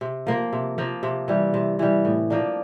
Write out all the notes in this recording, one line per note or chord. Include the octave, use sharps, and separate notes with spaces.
C3
F3 A#3
C3
F3 A#3
C3
E3 G3
C3
E3 G3
A2
F3 A#3 D4